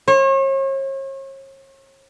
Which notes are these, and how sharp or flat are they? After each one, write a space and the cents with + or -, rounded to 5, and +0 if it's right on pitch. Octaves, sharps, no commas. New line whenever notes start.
C#5 -40